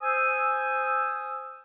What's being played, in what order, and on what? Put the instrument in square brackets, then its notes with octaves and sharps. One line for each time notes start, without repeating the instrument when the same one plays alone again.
[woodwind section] C5 G#5 D#6 E6